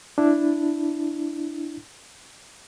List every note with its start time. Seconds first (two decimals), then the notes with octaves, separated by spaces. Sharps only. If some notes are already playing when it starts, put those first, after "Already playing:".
0.18 D4 E4